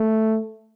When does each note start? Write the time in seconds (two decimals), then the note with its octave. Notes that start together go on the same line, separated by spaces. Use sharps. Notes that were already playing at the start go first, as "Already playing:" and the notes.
Already playing: A3